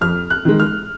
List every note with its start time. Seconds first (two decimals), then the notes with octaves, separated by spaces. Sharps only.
0.01 F2 F6
0.30 F#6
0.45 D#3 G#3
0.60 F6